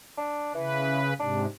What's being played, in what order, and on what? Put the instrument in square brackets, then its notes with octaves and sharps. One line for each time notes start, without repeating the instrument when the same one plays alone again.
[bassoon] D4
[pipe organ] C#3 B4 [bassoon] E3
[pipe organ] G#2 C3 [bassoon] D4